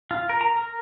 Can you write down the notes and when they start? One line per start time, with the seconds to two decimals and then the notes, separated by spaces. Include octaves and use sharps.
0.11 F4
0.29 A#4
0.41 A#5
0.56 A#4